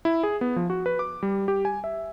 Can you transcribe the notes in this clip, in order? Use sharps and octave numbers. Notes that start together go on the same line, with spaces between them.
E4
G#4
B3
F3
F#4
B4
D6
G3
G4
G#5
E5